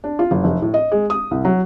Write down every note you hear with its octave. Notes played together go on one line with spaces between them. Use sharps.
D4
F4
F#1
F1
A2
D#5
G#3
D#6
C2
F#3